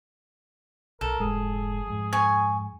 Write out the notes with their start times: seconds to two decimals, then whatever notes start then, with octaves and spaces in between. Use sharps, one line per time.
1.01 B1 A4 A#4
1.20 F1 G#2 G#3 G#4
1.87 F2 G#2
2.13 G#5 C#6